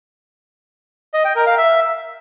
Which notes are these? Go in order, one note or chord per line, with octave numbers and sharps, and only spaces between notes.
D#5
G5
A#4
F5
E5